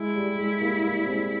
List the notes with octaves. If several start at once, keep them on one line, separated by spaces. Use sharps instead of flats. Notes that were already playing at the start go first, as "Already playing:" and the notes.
Already playing: G#3 E4
G3
G3
G#3
G3 A#3
G3 A#3
G#3 C4